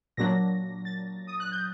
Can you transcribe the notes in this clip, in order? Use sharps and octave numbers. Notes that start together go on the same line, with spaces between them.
A#2 F#3 A#3 D4 A#6
A6
D#6
F#6
G6